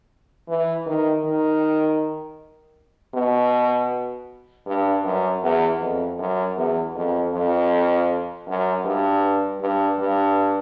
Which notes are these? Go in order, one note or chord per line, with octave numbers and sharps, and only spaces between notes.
E3
D#3
D#3
B2
G2
F#2
E2
F2
F#2
E2
F2
F2
F#2
G2
G2
G2